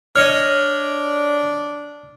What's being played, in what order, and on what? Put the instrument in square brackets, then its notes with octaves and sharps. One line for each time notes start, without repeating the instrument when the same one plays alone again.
[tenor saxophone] D4 [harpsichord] C#5 D#5 [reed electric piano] F6